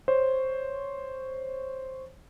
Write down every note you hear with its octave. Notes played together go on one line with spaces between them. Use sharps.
C5 C#5